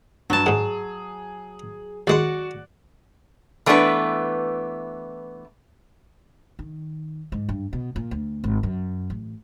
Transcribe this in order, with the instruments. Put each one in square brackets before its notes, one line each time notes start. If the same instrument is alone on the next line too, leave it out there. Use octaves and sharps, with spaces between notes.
[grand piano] G2 [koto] F#3 A5
[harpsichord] G#2 F#5 [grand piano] G#4
[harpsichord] D#2 G#3 C6 [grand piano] F#4 [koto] D5 F#5
[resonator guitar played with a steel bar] E3 A3 B3 D4 B4
[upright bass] D#3
G#2
G2
B2
A#2
D2
G#1
F#2
A1